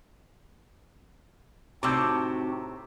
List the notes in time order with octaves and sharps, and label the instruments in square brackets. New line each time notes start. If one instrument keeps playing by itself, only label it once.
[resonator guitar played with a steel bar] A2 C3 [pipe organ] C4 D#4 F#4 [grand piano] D6 E6 G6